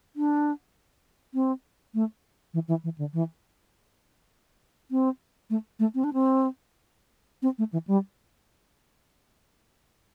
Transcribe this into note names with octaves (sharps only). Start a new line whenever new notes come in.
D4
C4
A3
E3
E3
E3
D3
E3
C4
A3
A3
C4
D4
C4
C4
A3
E3
G3